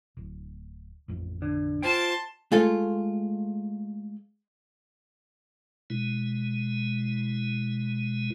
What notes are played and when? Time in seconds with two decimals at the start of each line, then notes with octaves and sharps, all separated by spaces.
0.17 D1
1.08 A1 F2
1.42 D3
1.83 F4 C5 G5 A5 C6
2.52 G#3 A3 F4 G#4 A4
5.90 B2 G#3 E4